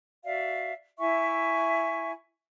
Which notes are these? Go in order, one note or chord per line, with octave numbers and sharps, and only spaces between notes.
F#4 D5 E5 F5
E4 E5 G#5 C#6